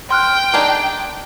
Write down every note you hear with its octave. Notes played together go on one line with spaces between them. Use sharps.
G5 C6 F6 F#6
D4 D#4 G#4